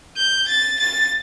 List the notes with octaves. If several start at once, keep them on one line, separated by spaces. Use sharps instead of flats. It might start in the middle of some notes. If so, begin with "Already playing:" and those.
G6
A6
A6